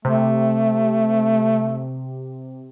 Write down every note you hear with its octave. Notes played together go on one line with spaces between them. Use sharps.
C3 A3